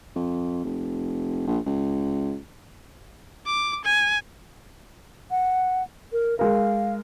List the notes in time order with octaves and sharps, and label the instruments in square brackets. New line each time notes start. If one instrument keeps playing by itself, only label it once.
[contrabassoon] F2
F1
A#1
C#2
[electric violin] D6
G#5
[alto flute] F#5
A#4
[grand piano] G#3 A#4 [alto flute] F5